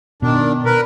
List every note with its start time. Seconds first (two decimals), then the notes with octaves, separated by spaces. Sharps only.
0.22 B2 D#3 D4
0.65 A#4 B4